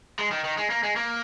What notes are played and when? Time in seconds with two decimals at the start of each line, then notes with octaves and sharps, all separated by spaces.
0.19 G#3
0.31 D#3
0.44 D#3
0.57 G#3
0.70 A#3
0.83 G#3
0.96 A#3